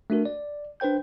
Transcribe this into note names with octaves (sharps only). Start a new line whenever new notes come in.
A3 D4 F#4 A#4
D5
D4 B4 C5 G5 G6